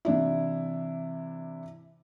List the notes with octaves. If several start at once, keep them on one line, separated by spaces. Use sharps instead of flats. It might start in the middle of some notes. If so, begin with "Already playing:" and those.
C3 E3 D4 E4